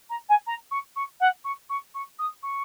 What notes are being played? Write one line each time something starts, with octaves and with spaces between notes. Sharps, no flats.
A#5
G#5
A#5
C#6
C#6
F#5
C#6
C#6
C#6
D#6
C#6